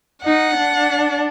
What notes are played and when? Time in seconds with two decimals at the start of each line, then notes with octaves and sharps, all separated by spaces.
0.24 D#4 F#5
0.56 D4